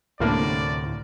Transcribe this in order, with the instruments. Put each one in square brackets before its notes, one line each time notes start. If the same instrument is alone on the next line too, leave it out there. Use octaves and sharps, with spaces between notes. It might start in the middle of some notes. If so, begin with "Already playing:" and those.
[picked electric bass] D2 [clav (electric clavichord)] A2 C3 [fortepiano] G3 A#3 D4 [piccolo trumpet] D5